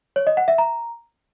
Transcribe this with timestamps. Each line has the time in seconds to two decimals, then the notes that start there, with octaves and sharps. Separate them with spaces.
0.16 C#5
0.27 D#5
0.37 F#5
0.48 E5
0.58 A#5